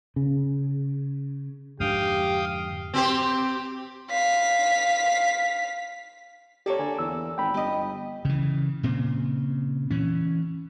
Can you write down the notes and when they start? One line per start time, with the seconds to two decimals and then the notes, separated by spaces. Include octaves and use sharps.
0.16 C#3
1.80 F2 G#2 D3 G4 F5 G5 D#6
2.94 C4 G4 C5
4.10 F5 B6
6.66 A#3 G4 A4 C#5 D5
6.79 D3 G#5
6.99 E2 E6
7.38 G#1 G5 B5
7.54 G1 G4 D#5
8.25 C#3 E3
8.83 A#2 C#3 C4
9.91 E3 C#4